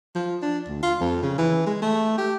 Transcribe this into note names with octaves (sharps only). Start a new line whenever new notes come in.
F3
D4
D2
F4
F2
C#3
E3
G#3
A3
G4